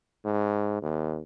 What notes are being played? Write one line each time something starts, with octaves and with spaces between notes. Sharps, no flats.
G#2
D#2